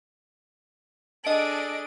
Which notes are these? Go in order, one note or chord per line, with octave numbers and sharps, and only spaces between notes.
D4 G#4 A4 D#5 D7